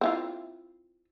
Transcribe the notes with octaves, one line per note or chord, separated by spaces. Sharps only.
C4 E4 F4